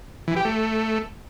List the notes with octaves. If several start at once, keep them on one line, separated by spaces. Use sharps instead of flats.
E3
G4
A3